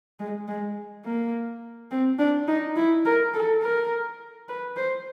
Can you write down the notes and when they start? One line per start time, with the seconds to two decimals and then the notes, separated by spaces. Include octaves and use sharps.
0.20 G#3
0.48 G#3
1.05 A#3
1.91 C4
2.19 D4
2.48 D#4
2.76 E4
3.05 A#4
3.34 A4
3.62 A#4
4.49 B4
4.77 C5